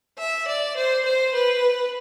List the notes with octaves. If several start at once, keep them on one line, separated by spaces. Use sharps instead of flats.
E5
D5
C5
C5
B4